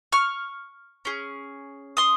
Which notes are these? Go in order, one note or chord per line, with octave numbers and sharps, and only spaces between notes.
C#6 F6
C#4 G#4
C6 D#6